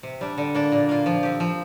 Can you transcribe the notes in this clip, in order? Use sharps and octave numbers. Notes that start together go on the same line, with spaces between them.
C3
G3 D4
D3
A#3 D4
A#2
A#3 F4
F3
C4 G4
F3